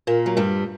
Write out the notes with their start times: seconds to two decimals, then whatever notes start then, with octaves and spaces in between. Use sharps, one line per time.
0.07 A#2 A#3
0.26 F#3
0.37 G2 G3